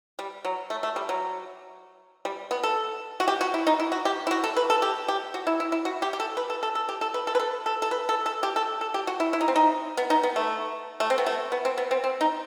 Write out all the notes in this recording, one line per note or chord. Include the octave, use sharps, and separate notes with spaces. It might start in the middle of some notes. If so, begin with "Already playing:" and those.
G3
F#3
A3
A3
G3
F#3
G3
B3
A4
F#4
G4
F#4
E4
D#4
E4
F#4
G4
E4
F#4
A4
B4
A4
G4
G4
F#4
E4
E4
E4
F#4
G4
G4
A4
B4
A4
A4
A4
G4
A4
B4
A4
B4
A4
A4
A4
B4
A4
A4
G4
A4
A4
G4
F#4
E4
E4
D#4
C4
D#4
B3
D#4
B3
A3
A3
C4
B3
A3
B3
C4
B3
C4
C4
D#4